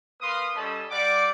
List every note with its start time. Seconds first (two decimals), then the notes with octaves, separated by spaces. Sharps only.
0.21 A#3 B4 F5 C6 D#6
0.54 G3 C#4 A4 D#5 A5 B5
0.90 G3 D5 F#5 D6